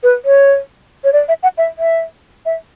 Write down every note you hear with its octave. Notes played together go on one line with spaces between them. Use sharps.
B4
C#5
C#5
D5
E5
F#5
E5
E5
E5